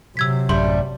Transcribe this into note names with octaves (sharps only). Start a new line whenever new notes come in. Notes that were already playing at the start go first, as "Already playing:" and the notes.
C3 F#3 E6 G#6 B6
A1 F#2 G3 A3 C6